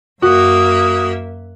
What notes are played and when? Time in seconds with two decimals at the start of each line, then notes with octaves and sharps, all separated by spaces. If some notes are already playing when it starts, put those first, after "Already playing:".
0.22 F#2 A#3 F#4 E5 D#6